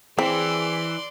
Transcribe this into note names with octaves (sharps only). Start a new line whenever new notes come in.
E3 C4 G#4 D5 C6